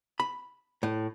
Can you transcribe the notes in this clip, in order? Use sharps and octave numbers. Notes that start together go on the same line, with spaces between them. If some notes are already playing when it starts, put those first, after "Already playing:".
B5
A2